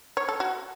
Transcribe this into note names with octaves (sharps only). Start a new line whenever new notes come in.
C#5
A4
F#4